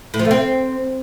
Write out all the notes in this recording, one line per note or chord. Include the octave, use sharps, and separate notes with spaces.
A2
F3
A3
C4